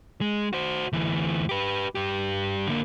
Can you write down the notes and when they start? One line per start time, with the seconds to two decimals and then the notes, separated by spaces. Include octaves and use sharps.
0.21 G#3
0.53 F#4 C5
0.93 D2 E3
1.49 G4 B4
1.95 G2 G4
2.67 D3 A#3